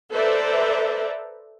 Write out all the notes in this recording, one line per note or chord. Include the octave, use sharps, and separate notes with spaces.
A4 B4 C5 D5 E5 A#5